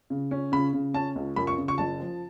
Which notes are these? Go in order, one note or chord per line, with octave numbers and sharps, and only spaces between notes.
C#3
C#4
C#3 B5
C#3
C#4 A5
C#2
F#2 B5
C#6
C#3
C#6
F#1 A5
F3